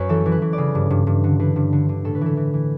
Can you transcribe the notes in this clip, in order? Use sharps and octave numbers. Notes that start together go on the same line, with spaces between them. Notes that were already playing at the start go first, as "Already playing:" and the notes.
Already playing: F#2 B4 C#5
E3 A4
E3
B4
E3
D5
C#3
G2
G2
G2
D3
D3 B4
G2
D3
D3
A2 A4
B4
E3 A4
E3
E3